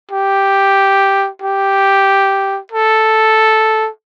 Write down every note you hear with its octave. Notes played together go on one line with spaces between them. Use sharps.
G4
G4
A4